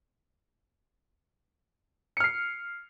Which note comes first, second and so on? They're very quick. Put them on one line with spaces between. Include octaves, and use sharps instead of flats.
C#7 F6 C7